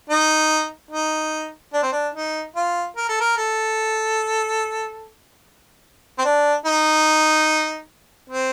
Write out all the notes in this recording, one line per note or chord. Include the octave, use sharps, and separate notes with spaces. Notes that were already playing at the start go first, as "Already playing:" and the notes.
D#4
D#4
D4
C4
D4
D#4
F4
A#4
A4
A#4
A4
C4
D4
D#4
C4